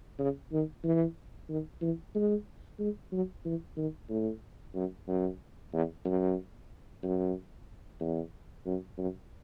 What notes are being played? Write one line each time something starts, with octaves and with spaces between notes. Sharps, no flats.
C#3
D#3
E3
D#3
E3
G#3
G#3
F#3
E3
D#3
A2
F#2
F#2
E2
F#2
F#2
E2
F#2
F#2